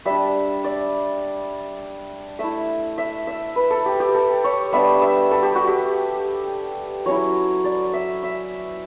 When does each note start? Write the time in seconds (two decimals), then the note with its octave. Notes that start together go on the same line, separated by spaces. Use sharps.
0.05 G3 D4 E5
0.64 D5
2.39 A3 E4 E5
2.98 E5
3.27 E5
3.56 B4
3.70 A4
3.86 G4
4.00 G4
4.15 A4
4.44 C#5
4.72 G3 B3 D4 E5
5.02 E5
5.31 A4
5.43 G4
5.55 F#4
5.67 G4
7.06 F#3 C#4 E4 C#5
7.64 D5
7.93 E5
8.23 E5